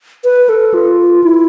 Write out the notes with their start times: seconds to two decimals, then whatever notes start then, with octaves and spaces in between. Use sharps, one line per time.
0.24 B4
0.49 A4
0.74 F4
1.23 E4